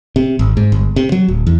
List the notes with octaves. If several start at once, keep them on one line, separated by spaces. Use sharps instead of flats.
C3
G#1
G#2
G1
C3
F#3
D1
E2